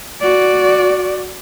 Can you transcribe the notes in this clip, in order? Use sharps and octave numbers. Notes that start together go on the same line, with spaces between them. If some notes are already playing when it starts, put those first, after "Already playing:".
F#4 D5